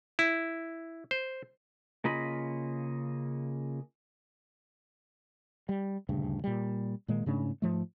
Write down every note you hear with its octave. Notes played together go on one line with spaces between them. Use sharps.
E4
C5
C#3 A#3 F4 D#5 B5
G3
D#1 D2 G2 C#3
A#2 G3
A#2 D#3 G#3 A#3
G#2 C#3 A3 D4
G#2 F3 A3